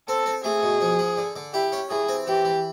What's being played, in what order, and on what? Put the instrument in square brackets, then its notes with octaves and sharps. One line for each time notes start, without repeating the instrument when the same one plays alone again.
[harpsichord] C4 [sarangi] A4
[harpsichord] C4
[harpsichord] A3 [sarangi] G#4
[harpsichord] B2
F3
F3
D3
D3
[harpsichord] E4 [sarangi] G4
[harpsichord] C#4
[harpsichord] E3 [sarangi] G#4
[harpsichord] C4
[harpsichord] E3 [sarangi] G4
[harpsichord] E3